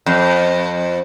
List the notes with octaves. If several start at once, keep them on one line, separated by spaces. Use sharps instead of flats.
F2